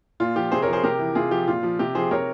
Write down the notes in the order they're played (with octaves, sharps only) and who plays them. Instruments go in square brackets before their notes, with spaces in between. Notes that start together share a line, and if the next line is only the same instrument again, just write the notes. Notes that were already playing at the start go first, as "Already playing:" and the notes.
[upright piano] A#2 F4
F3 G4
C3 G#4 C5
A#4 C#5
F3
G#4 C5
C3 G4 A#4
E3
C3 F4 G#4
F3 G4
A#2 F4
F3
C3 G4
F3 G#4 C5
C3 A#4 C#5